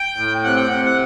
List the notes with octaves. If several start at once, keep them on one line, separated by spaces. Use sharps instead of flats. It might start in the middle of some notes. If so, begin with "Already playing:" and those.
Already playing: G5
A2
C3 F#5
G5
C3 F#5
F#5